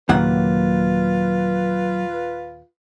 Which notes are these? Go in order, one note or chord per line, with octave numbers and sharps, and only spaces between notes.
D#2 A#2 C#3 F#3 A#3 F4 B4 F#5